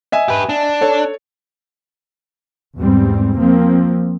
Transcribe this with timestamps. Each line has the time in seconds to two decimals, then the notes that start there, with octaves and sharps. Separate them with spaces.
0.12 D#5 E5 G#5
0.28 G4 B4
0.49 D4
0.81 A4 C#5
2.78 E2 G#2 G3 C4
3.38 F3 A#3 C4